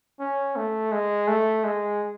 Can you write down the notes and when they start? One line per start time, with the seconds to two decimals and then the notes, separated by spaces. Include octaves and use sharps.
0.20 C#4
0.56 A3
0.92 G#3
1.28 A3
1.64 G#3